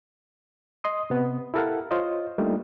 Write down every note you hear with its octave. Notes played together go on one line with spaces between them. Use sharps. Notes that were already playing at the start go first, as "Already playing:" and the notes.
D#5 C6 D#6
C3 B3
E4 G4 A4 A#4 F5 F#5
F4 C5 C#5 D#5
G3 A3 A#3 D4 D#4 F4